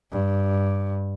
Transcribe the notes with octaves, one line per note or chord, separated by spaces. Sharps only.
G2